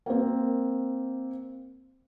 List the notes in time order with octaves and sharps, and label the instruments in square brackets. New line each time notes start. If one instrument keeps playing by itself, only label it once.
[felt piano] A#3 C4